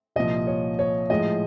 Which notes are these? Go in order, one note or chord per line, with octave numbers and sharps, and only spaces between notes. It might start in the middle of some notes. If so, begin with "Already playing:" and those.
C2 A#2 F3 D#5
C#5
C#5
A2 F3 G#3 D#5